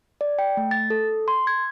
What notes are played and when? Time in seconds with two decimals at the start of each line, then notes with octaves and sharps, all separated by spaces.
0.21 D5
0.39 G5
0.57 A3
0.71 A6
0.90 A4
1.28 C6
1.47 G#6